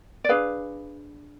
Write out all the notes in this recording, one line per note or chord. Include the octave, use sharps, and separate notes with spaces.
D5
D4 G#4 B4 F5